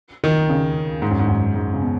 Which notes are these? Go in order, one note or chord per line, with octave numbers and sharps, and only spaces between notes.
D#3
C#3
G#2
F#2
G#2
F#2
G#2
C#3
B2